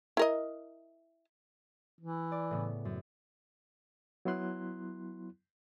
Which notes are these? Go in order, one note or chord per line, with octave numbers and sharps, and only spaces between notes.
E4 A#4 D#5
E3
D5
A2 C#3 B3
F#2
F#3 B3 E4 C6 F#6